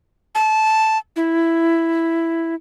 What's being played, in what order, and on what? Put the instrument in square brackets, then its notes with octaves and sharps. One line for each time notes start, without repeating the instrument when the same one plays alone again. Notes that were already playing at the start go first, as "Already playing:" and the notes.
[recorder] A5
E4